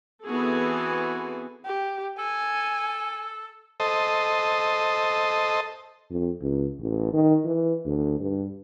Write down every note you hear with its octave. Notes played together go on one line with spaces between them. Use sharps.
E3 B3 C4 F#4 G#4 A4
G4
A4 G#5
A4 C5 D#5
F2
C#2
A1
D#3
E3
D2
G2